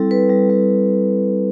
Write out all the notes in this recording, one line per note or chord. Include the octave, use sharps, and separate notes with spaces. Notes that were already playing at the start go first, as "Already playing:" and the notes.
Already playing: G3 C4 E4 A4
G3 B4
G3
G3